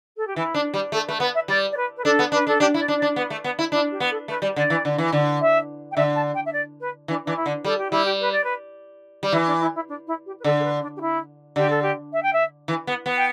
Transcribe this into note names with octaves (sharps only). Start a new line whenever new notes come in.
A4
G4
E3 E4
D4
G3
A3 A4
A3 B4
B3 B4
E5
G3 D5
D5
B4
B4
D4 A4
B3
D4 B4
D4 A4
D4 G4
E4
D5
D4
D5
D4
B3 B4
A3
B3
E4
D4 E4
G4
B3
A4
A3 B4
G3
D3 D5
E3
D3
E3
D3
E5
G5
D3 E5
A5
G5
E5
D5
B4
E3 D4
E3 D4
E4
D3
G3 A4
G4
G3 E4
G4
B4
D5
B4
G3
E3 E4
D4
E4
E4
D4
E4
G4
B4
D3 A4
A4
B4
D4
G4
E4
D3 G4
A4
G4
E5
G5
E5
E3
B3
B3
G5